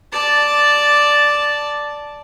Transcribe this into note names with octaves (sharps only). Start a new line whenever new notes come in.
D5 A5